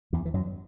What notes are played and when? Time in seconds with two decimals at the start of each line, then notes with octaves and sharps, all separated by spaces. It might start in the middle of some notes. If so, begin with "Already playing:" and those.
0.13 E2 E3
0.25 E3
0.34 F#2 F#3